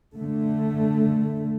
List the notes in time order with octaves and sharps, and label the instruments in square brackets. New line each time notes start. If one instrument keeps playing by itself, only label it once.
[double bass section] D3 A3